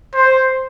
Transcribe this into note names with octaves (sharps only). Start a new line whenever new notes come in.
C5